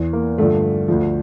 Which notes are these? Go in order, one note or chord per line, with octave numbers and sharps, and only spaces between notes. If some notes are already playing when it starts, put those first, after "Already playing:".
Already playing: E2 E3
A#3
G2 D3 F3 A3
D2 D3 F3